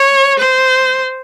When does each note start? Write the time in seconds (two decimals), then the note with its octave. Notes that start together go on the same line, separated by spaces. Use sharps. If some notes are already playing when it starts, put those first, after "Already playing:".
Already playing: C#5
0.39 C5